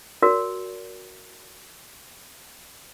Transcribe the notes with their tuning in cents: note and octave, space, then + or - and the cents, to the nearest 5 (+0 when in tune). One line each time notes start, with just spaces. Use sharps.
F#4 +0 A#4 +0 D5 -45